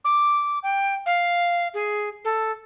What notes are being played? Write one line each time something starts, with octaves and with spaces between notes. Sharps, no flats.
D6
G5
F5
G#4
A4